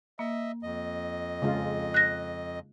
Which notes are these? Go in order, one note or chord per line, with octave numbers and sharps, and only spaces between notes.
A#3 D#5 E5
F2 D#5
C#3 G#3 F4
F#6 A#6